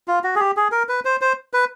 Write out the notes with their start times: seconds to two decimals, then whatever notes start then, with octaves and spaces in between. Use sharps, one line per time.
0.08 F4
0.24 F#4
0.36 G#4
0.40 G4
0.57 G#4
0.72 A#4
0.89 B4
1.05 C5
1.21 C5
1.53 B4